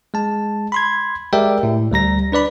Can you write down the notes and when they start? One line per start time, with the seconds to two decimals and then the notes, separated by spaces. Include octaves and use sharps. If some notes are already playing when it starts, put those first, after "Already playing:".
0.14 G#3 A5
0.72 B5 C6 G#6
1.33 G#3 G4 A#4 D5 E5 G5
1.63 A2
1.91 D2 G3 A#5 A#6
2.32 D4 B4 D5 B5